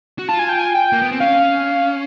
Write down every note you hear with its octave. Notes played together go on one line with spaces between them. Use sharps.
F#4
F4 A5
G#5
G5
G#5
G5
A#3
B3
C4
C#4 F5